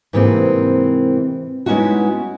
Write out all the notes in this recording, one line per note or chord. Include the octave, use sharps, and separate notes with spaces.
G#2 C3 E3 A#3 C4
G#3 B3 C#4 D#4 E4 F#4